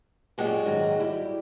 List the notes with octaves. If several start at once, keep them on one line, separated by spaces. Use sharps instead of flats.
F#2 A#2 G#3 F#4 G4
G#2 D#3 F#3
G3 E4 G4